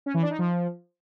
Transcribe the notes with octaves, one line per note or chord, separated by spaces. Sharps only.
C#4
E3
D4
D#4
F3